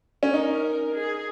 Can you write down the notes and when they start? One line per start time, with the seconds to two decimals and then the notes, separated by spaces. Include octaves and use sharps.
0.23 C#4
0.33 D#4 A#4
0.95 G#4